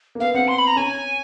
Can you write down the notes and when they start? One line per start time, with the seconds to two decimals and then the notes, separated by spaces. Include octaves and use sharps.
0.15 A#3
0.20 B3 F5
0.34 C4 F#5
0.48 C6
0.58 B5
0.67 A#5
0.76 C#4 G#5